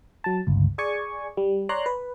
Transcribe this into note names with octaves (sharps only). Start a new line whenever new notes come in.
F#3 A5
G1 C#2
G#4 D5 G#5 C#6
G3
C#5 D5 A#5 C6 F#6
B4